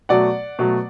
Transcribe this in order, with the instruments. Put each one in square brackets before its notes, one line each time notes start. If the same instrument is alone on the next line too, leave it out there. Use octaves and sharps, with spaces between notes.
[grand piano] B2 F#3 A3 D5 F#5
B2 F#3 A3